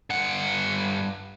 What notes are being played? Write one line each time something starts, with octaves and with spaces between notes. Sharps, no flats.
G2 F#5